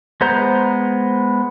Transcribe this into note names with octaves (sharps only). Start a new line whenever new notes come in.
G#3 B3 C5 A#5 G6